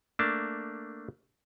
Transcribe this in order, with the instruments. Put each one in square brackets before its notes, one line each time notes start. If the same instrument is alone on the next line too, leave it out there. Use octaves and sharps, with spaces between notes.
[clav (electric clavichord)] A3 A#3 D4 A5